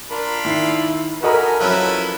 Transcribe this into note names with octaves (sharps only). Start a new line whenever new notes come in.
D4 F4 A#4 B5
D#3 E4 C7
F#4 A4 A#4 D#5 G#5 B5
F3 F#3 C#4 E4 A4 B4